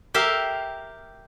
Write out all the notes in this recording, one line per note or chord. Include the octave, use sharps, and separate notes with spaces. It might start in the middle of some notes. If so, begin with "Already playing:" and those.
G4 A#4 E5 F5